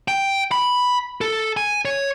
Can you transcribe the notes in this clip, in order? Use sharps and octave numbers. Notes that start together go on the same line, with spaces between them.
G5
B5
A4
G#5
C#5